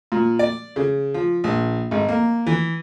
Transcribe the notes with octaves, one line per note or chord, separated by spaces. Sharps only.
A#2
D5
C#3
F3
A#1
G#1
A#3
E3